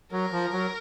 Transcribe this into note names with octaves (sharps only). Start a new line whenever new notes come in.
F#3 A#4
F3
F#3